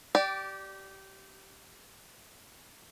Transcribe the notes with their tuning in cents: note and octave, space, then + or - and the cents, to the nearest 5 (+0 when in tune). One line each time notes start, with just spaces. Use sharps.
G4 -20 D5 +0